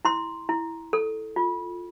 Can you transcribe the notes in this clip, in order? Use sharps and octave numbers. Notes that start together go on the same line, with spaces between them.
E4 C6
E4
A4
F4